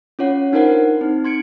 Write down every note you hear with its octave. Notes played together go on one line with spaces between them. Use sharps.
C#4 F4 C#5 F#5
D4 D#4 F4 A#4 C5 F#5
C4 D#4
C6 G#6 C#7 D7